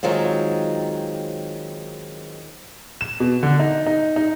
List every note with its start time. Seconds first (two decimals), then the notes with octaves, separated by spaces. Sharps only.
0.03 D#3 F#3 G#3 C4 F4
3.01 E7
3.20 B2
3.43 D3
3.59 D#4
3.86 D#4
4.16 D#4